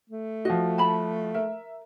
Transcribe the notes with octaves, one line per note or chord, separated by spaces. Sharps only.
A3
F3 F#4 D#5
A5 B5
A#4 E5